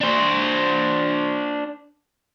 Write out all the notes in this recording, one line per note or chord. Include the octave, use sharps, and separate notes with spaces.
D4 C5